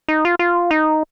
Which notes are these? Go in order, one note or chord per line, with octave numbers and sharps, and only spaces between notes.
D#4
F4
F4
D#4